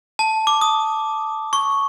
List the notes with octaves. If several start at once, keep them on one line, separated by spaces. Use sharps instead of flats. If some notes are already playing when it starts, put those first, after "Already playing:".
A5
D6
D#6
C#6